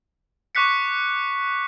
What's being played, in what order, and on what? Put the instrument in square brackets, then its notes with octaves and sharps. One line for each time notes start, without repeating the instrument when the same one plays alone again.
[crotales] C#6 D6 F#6 B6 C#7